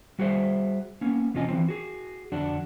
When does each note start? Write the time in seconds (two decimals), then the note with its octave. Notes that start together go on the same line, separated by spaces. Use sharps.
0.19 G3 F#4 G#4 C5 E5
1.01 A#3 B3 C#4
1.34 E2 C3 C#4 F4 D#5 G#5
1.49 E3 G3 C4
1.68 F#4 G#4
2.32 F2 D3 D4 F#4